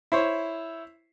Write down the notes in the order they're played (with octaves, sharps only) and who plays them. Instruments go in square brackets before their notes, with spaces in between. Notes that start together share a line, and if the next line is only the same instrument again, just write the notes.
[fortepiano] E4 C5 C#5